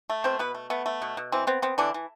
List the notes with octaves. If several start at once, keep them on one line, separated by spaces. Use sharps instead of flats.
A3
B2 C4 C5
B2 B3 B4
A3
A3 B3
A3
B2
B2
E3 C4
B3 C4
B3 C4
D3 E3 D4
E3